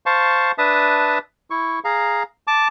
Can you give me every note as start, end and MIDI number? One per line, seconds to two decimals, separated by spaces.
0.06 0.52 72
0.06 0.52 77
0.06 0.52 81
0.06 0.52 85
0.58 1.18 62
0.58 1.18 71
0.58 1.18 76
0.58 1.18 81
0.58 1.18 87
1.50 1.79 64
1.50 1.79 85
1.84 2.23 68
1.84 2.23 77
1.84 2.23 82
2.47 2.68 81
2.47 2.68 86